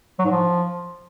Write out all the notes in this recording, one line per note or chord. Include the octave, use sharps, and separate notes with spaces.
F#3
G#2
F3